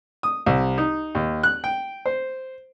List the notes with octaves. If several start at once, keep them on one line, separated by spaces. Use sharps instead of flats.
D#6
C2
D#4
D#2
F#6
G5
C5